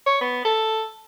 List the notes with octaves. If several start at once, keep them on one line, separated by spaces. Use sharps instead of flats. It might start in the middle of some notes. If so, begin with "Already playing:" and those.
C#5
B3
A4